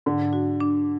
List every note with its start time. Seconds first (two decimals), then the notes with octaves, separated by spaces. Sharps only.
0.06 G#2 D3
0.33 F#4
0.60 D4